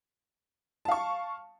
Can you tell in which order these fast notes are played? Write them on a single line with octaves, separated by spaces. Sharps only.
A5 F5 C#6